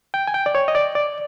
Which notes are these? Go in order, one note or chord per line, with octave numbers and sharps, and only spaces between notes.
G5
G#5
G5
D5
C#5
D#5
D5
D5